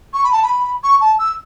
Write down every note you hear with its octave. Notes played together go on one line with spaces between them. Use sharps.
C#6
B5
A5
B5
C#6
A5
E6